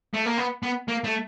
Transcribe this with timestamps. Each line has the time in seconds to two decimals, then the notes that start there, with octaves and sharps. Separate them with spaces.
0.14 A3
0.25 A#3
0.38 B3
0.63 B3
0.88 A#3
1.04 A3